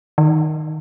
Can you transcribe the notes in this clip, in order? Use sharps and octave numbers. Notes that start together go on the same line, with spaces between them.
D#3